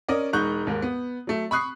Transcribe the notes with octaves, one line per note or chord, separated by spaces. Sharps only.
C#4 A#4 D5 D#5
E1 G#3 D#4 C#6 F#6 G6
D#2 G#2 A#4
B3
F#3 A3
B5 C#6 D#6 F#6 C7